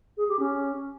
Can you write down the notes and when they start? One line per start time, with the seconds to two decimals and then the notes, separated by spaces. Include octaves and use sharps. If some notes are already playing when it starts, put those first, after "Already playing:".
0.17 G#4
0.28 G4
0.39 C#4